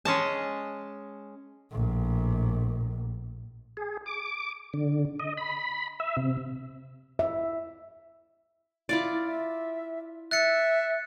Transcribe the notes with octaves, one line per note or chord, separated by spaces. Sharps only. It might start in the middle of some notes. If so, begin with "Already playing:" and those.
G#3 C#4 D#5 A5
A#1 A2
G#4
D6
D3
D#5
B5
E5
C3
E5
E4 F4 D5
E5
E5 F#6 A6 C#7